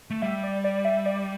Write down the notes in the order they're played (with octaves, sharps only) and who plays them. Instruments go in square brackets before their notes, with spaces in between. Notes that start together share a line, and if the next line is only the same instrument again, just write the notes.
[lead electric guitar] A3
[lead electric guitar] G3 [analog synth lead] E5
[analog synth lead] D5
D5
E5
D5